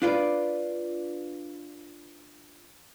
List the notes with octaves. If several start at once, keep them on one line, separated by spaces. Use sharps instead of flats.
D4 F4 B4 D5